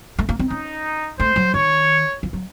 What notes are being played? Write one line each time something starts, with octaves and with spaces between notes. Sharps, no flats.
A3
A#3
C4
C#4 D#4
A3 C5
F#3
D#3 C#5
F3
F#3